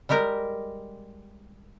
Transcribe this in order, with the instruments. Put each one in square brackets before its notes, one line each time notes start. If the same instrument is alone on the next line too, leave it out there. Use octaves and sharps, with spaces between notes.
[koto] G3 G#3 G4 A#4 A#5